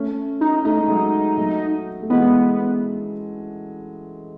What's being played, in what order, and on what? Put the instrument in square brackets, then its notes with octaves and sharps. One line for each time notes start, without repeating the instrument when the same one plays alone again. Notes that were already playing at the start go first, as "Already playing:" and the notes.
Already playing: [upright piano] A3 C#4
[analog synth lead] D#4
[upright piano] A3 [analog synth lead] D#4
[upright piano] G#3
F#3 A3
F#3 A3
A3
[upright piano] E3 G#3 [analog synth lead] B3